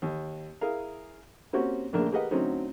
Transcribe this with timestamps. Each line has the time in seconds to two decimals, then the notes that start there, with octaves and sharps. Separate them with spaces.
0.02 D#2
0.61 E4 G#4 A#4 F5
1.53 A#3 C4 C#4 F#4 G4 C#5
1.93 A#1 C#3 A3 A#3 D4 A#4
2.12 G4 G#4 A#4 B4 D#5 F#5
2.31 D3 F#3 A3 C4 C#4 D#4